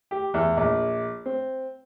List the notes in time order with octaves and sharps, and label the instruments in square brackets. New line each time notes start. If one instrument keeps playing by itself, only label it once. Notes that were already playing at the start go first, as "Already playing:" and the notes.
[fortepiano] G4
E2
A#1
C4